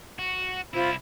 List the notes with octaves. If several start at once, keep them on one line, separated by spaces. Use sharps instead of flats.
F#4
C2 E4 F4 C5 B5